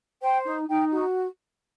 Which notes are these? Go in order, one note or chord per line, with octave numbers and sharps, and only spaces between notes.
C5 G5
D#4
D#4 G5
F#4